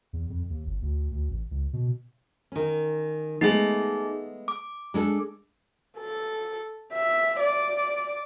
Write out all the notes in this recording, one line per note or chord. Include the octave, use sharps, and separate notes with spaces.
E2
F2
D#2
G1
D2
D2
A1
C#2
B2
D#3 C#4
G#3 A3 B3 D#4 G#4
D6
G#3 D4 A4
A4
E5
D5